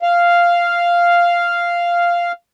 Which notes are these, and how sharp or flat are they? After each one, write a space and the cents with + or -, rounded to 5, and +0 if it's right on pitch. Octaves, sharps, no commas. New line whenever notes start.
F5 -5